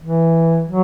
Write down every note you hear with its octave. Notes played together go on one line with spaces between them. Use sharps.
E3
F#3